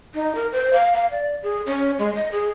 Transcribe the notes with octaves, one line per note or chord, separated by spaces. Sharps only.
D#4
A#4
C5
F5
F5
D5
G#4
C#4
G#3
D#5
G#4